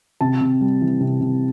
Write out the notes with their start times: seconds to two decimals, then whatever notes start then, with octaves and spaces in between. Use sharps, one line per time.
0.21 C3 A5
0.41 C3
0.61 G3
0.81 E3
1.01 C3
1.21 C3